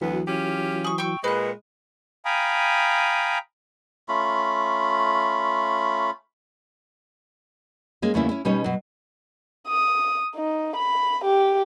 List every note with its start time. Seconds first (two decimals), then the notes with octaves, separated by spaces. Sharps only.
0.01 D2 E3 F#3 B3
0.28 C#4 F4 G4
0.84 G#4 C#6
0.98 G5 C#6 E6
1.24 A#2 G#3 B4 C#6 F#6
2.25 F5 G5 G#5 A#5 B5 D#6
4.09 A3 C#4 F4 B5
8.02 G#3 A#3 C#4
8.14 E2 C#3 A3 A#3 C#4 E4
8.29 C#4 E4
8.45 B2 G3 C#4 D#4 C#5
8.64 B2 F#3
9.68 D#6
10.36 D#4
10.76 B5
11.25 G4